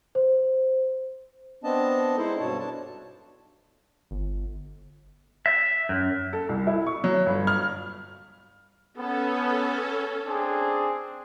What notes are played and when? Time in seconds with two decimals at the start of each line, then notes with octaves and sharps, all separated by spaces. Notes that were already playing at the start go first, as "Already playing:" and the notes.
0.15 C5
1.64 B3 C4 D4 D#5 A5
2.17 G#3 D#4 E4 A4 C5
2.39 G2 B2 C#5 A5
2.59 D4 A5
4.11 G1
5.46 E5
5.89 F#2
6.33 A4
6.49 C2
6.67 E4
6.86 C#6
7.04 F#3
7.26 G1
7.47 F6
8.98 B3 C#4 A4
10.27 C4 D4 G#4